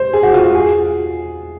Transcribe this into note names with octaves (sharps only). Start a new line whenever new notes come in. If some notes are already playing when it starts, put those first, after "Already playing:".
Already playing: C5
G#4
F#4
F4
F#4
G#4